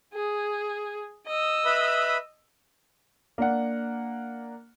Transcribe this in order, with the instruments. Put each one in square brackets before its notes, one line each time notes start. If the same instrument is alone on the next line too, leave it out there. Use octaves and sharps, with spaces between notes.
[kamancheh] G#4
D#5 E6
[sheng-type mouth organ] B4 E5 B5
[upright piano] A#3 D4 F#5